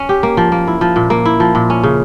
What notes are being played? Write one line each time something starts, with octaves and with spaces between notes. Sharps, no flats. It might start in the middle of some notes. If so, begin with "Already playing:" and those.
Already playing: C#4
G4
A#3
F3
A#3
E4
F3
A#2
A#3
E4
F3
A#2
C#4
C#3